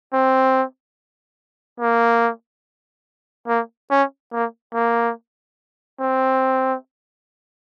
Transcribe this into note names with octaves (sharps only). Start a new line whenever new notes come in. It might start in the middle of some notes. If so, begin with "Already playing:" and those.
C4
A#3
A#3
C#4
A#3
A#3
C4